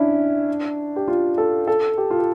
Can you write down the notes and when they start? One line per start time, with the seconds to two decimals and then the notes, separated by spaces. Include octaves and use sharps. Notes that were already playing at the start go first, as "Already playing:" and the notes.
Already playing: C#4 D4 E4
0.96 G4
1.08 F4
1.38 A4
1.68 A4
1.98 G4
2.10 F4
2.19 G4